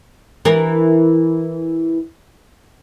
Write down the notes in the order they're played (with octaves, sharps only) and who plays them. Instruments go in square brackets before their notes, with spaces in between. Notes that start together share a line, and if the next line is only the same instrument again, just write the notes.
[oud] E3 A#4